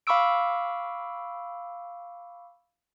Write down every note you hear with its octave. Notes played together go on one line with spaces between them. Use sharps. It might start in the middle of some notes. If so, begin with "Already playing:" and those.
F5 B5 C#6 D6 E6 D7